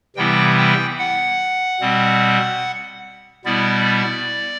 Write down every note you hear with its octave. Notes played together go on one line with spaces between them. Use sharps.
C3 E3 G3 B3 E4 G5
G5
F#5
B2 G3 C4
B2 G3 B3 E4 D5